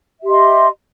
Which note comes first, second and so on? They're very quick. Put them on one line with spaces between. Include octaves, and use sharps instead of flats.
E5 G4 C6 D#5